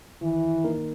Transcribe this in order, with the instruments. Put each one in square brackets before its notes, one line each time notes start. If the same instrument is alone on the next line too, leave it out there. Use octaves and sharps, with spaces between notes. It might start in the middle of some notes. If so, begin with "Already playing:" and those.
[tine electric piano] D#3 [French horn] E3
[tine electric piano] A#3 D#4 A#4